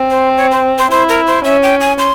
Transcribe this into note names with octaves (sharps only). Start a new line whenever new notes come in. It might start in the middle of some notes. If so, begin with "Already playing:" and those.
Already playing: C4
C5
C#5
C5
C5
E4 C5
A#4
C5
C#4 E5
G5
G#5
C6